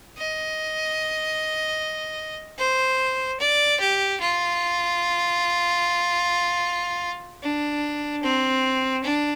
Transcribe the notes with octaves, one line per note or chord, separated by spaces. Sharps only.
D#5
C5
D5
G4
F4
D4
C4
D4